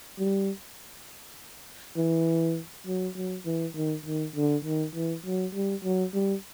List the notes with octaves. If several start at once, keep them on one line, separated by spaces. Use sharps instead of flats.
G3
E3
F#3
F#3
E3
D#3
D#3
D3
D#3
E3
F#3
G3
F#3
G3